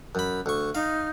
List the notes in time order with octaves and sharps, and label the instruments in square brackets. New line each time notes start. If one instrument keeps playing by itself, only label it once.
[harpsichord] F#2 B5
D2 C#6
[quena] D#4 [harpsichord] F5